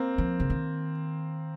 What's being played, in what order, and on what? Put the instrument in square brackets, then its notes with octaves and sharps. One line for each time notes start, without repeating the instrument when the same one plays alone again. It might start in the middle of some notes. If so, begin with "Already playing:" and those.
Already playing: [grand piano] A#3 C4
[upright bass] F3
C#3
D#3